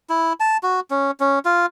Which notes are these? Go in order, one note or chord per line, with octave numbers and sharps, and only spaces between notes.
E4
A5
F#4
C#4
C#4
F4